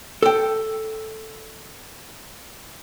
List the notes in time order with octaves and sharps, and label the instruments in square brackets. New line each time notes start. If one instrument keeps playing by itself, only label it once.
[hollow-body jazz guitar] A4 G5